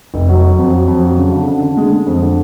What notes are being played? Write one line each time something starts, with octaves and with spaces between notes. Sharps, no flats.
F1
F#3
F#3
F2
F#3
F2
F#3
C#3
D3
D3
D3
G#3
G#3
F2
D3